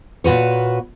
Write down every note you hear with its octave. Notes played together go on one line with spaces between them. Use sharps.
A#2 F#4 B4 C#5